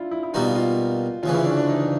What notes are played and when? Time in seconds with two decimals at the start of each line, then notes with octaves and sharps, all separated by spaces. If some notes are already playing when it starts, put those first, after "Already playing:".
Already playing: D4 E4 F4
0.11 E4
0.23 E4
0.33 B2 G3 A#3 D#4 F4
0.56 F4
1.23 D2 C#3 E3 F4
1.34 E4
1.45 D4
1.57 D4
1.69 D#4